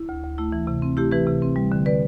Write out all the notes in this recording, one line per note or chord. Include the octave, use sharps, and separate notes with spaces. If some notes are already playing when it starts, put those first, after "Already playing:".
Already playing: E4
D2
D2
A3 E4
E3
C3
C4
A3 E4 G4
E3 G4 B4
C3
C4
G3
D3
B4 D5